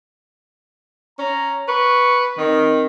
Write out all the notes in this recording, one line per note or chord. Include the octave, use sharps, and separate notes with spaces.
C#4 A#5
B4 C#6
D#3 C4